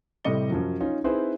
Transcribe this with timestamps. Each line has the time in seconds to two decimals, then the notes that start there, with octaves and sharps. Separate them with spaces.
0.24 A2 C3 G3 D#5 C#7 G7
0.50 F#2 F3 F#3
0.80 C#4 D#4 F4
1.04 C4 D#4 E4 G#4 B4 C5